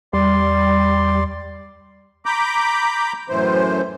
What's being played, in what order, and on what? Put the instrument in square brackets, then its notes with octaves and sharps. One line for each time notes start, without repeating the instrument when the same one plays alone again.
[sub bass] E2 [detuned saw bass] G3 [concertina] D5 C6
[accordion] A#5 B5 D6 G6
F#2 A2 E3 C5